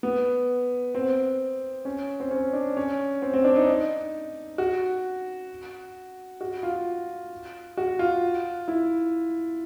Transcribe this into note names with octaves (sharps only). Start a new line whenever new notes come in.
B3
C4
C#4
C4
C#4
D4
C#4
C4
C4
D4
D#4
D#4
F#4
F#4
F4
F#4
F4
E4